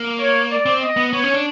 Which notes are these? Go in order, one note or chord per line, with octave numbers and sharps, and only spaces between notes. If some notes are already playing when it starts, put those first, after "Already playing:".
Already playing: A#3
C#5
D5
C4
D#5
B3
B3 C#5
C#4
D4